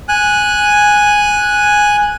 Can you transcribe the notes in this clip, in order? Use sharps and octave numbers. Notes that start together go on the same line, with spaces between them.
G#5 F#6